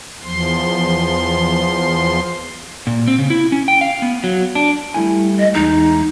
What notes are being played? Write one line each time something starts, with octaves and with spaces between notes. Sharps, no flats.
E2 F3 C6
A#2
C4
C#3
E4
C#4
G5
F5
B3
F#3
D4
G3 A3 E4 G#5
D#5
E2 G#3 D#4